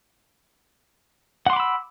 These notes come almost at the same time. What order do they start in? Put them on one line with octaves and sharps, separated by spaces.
F#5 C6 D6 B5 E6